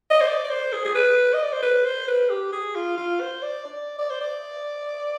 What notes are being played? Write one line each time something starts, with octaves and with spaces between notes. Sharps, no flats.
D#5
C5
D5
D5
C5
G#4
G#4
B4
D#5
D5
C5
B4
C5
B4
G4
G#4
F4
F4
C5
D5
D5
D5
C5
D5